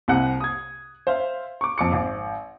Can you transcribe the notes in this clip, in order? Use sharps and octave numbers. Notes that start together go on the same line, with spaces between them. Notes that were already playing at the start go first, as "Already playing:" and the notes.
C2 C3 F#5 F#6
D#6 G#6
C5 E5 F5
C#6 D6
F2 D6 C#7
G#1